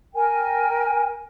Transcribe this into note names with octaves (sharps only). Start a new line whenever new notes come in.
A#4 G5 G#5